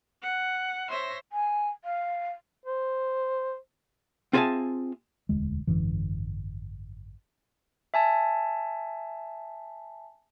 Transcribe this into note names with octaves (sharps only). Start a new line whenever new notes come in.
F#5
C5 C#5 E5 C6 A#6
G#5
F5
C5
C4 F4 G#4 E5 G#5 A5
E1 D2 G#3
G#1 F#2 D3 E3
E5 G#5 A5